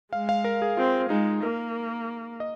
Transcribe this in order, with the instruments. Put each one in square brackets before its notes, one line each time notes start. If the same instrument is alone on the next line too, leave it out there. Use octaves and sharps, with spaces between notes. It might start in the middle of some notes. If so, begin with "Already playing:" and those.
[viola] G#3 [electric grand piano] F5
[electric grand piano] F5
A#4
G#4
[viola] C4 [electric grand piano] F4
[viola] G#3 [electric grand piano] D#4
[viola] A#3 [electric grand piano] A#4
[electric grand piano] D#5